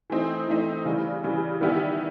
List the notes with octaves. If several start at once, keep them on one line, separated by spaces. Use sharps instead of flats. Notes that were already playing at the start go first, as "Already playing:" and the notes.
E3 A3 C4 D#4
E3 A3 C4 D#4
C#3 E3 G3
C#3 E3 G3
D#3 G3 B3 E4 G4